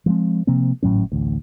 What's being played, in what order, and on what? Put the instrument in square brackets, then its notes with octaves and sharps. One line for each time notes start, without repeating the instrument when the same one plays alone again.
[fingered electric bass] F3 G#3 C4
C3 F3 A#3 C4
G#1 A2 F#3 C#4
A1 D2